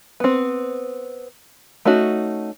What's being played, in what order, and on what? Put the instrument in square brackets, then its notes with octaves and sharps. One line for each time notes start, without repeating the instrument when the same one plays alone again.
[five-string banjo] B3 C4
A3 C#4 D#4 F#4